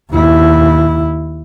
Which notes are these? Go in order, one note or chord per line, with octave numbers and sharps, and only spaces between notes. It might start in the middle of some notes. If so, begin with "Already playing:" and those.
D#2 E4